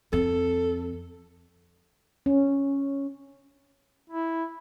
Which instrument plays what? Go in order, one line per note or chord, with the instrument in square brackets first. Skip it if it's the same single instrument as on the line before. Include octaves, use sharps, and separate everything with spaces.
[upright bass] F2 [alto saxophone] A4
[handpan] C#4
[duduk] E4